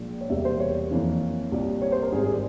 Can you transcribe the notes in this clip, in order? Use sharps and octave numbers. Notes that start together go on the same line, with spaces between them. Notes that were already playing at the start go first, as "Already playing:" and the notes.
Already playing: A#1 A#2 G#3
C#5
E1 E2 C3 G3 A#3 E5
C5
C#5
F2 E3 A#3
C2 A#2 G3
C#5
C5
A#4
G#1 G#2 G3 G#4
G#4
G4